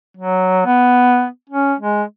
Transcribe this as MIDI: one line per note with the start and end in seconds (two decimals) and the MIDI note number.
0.17 0.65 54
0.65 1.26 59
1.50 1.74 61
1.79 2.03 56